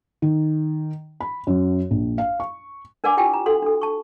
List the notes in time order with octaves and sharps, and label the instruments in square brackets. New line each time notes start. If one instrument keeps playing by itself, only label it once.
[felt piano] D#3
B5
F#2
A#1
F5
C#6
[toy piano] D4 A#4 D5 F#5 G#5 D6
E4 F4 G4 G5 G#5
A#5
D4 F#4 A4 F#5 C6
D4 A4
A5 C#6